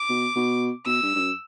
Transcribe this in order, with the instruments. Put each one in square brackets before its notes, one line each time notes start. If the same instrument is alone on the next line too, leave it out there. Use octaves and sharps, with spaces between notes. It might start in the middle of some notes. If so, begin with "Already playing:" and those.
Already playing: [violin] D6
[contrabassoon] B2
B2
[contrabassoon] B2 [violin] E6
[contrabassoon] G2
G2
F#2